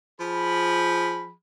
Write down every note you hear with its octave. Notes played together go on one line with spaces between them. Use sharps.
F3 G#4 B5